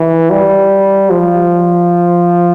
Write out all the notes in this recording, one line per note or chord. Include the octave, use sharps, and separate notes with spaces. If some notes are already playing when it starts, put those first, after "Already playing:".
Already playing: E3
G3
F3